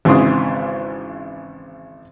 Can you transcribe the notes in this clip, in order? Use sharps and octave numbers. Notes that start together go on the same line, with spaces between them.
G#1 G#2 C#3 E3 C6 D#6